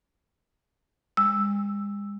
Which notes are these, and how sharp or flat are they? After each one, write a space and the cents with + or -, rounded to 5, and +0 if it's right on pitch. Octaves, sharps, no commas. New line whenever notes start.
G#3 -40 E6 +0